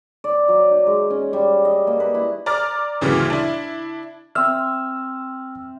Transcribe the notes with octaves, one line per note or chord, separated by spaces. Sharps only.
D5
F#3
D#4
G#3
C#4
G3
D#5
A#3
B4
E4
D5 A#5 D6 F6 A6
D2 A#2 C#3 E3 F#3 G3
D4 E4
C4 E5 E6 F6